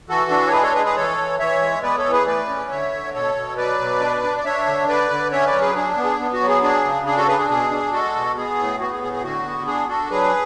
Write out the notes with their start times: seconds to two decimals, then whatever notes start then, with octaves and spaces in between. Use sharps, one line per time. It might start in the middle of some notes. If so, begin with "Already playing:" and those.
0.09 E3 F#4 A4
0.31 D4
0.47 C#5
0.52 G#3 G#4 B4
0.63 A4 C#5
0.75 G#3 G#4 B4
0.85 G#4 B4
0.96 E3 A4 C#5
1.18 E3
1.39 E3 C#5 E5
1.61 G#3
1.83 B3 B4 D5
1.98 A4 C#5
2.06 E3
2.12 G#4 B4
2.26 A3 B4 D5
2.49 C#4
2.70 D3 C#5 E5
2.93 D3
3.14 B2 A4 C#5
3.36 B2
3.57 F#3 B4 D5
3.79 B2
4.01 D4
4.23 D4
4.37 D5
4.45 D4 C#5 E5
4.66 D3
4.88 D3 B4 D5
5.10 D3
5.32 C#4 C#5 E5
5.46 B4 D5
5.53 F#3
5.61 G#4 B4
5.75 D4 G#4
5.97 B3
6.05 G#4
6.19 B3
6.33 F#4
6.41 F#3
6.48 G#4
6.62 D4 G#4
6.84 C#3
7.06 D4 G#4
7.17 F#4 A4
7.28 D4 G#4 B4
7.39 G#4
7.49 B2 G#4
7.71 D4
7.93 G#3 F#4 A4
8.15 B2
8.37 B3 G#4
8.58 A2
8.80 B3 F#4
8.91 G#4
9.02 A2 G#4
9.12 G#4
9.24 D3 F#4
9.46 B3
9.67 D4 G#4
9.89 D4 F#4 A4
10.11 F#3 G#4 B4